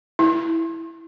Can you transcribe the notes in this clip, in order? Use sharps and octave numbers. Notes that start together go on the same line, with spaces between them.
E4